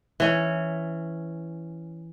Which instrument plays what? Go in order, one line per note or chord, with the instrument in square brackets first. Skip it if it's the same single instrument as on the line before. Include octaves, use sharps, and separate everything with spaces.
[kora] E3 C#4